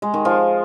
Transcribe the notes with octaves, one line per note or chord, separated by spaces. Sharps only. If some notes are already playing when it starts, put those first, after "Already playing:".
G#3
D#3
F3